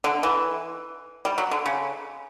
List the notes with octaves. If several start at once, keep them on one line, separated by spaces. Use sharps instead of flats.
D3
E3
G3
F#3
D3
C#3